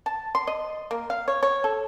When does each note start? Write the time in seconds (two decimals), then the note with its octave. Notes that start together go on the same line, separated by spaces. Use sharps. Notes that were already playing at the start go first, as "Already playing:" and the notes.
0.06 A5
0.35 C6
0.47 D#5
0.91 A#3
1.10 F5
1.28 C#5
1.43 C#5
1.64 A4